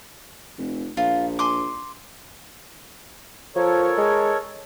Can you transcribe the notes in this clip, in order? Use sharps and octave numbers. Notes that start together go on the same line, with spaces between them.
F1
A#1 F4
G#5 C6 D6
F3 A4 A#4 C#5
G#3